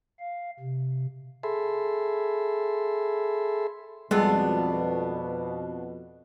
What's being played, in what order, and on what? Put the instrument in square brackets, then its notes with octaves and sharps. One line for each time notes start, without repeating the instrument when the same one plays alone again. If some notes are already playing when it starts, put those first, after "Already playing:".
[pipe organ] F5
C3
[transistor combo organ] G#4 A4 E5 B5 C6
[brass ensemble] F2 B2 [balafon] G3 [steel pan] G#3 A4 [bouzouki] B3 D4 F4